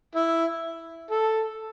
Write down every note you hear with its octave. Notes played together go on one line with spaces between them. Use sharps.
E4
A4